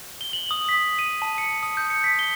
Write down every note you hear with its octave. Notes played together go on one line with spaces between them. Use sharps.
G7
F#7
D#6
B6
D#7
A5
C#7
D#6
G6
C#7
B6
G7